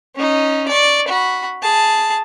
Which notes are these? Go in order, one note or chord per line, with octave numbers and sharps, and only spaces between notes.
C#4 D#4
D5 C#6
F#4 B5
G#4 A5